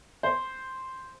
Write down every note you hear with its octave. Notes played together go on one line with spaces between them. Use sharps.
C5